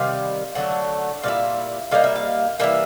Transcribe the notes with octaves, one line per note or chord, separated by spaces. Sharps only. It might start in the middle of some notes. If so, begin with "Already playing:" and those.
Already playing: C3 D#3 G3 F5
D3 F#3 A3 F#5
A#2 G3 E4 F5
D3 G3 A#3 D#4 F5
E5
F5
E3 G3 A#3 E5